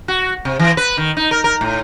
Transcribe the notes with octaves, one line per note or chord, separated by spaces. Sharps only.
F#4
C3
E3
B4
D#3
D#4
A#4
A#4
A2